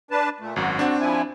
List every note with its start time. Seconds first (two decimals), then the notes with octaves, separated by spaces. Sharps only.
0.11 D4 B4 A5
0.40 A#2 A3
0.56 G#1 F#2 F#4
0.79 C4 D4
1.00 F3 E4 G#5